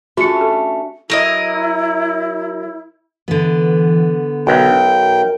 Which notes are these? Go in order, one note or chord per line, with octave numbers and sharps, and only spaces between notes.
A3 C#4 D4 F4 F#4 G#4 C#7
G4 A4
F#3 E4 A#4 D#5
D3 E3 B3
B1 A#4 G5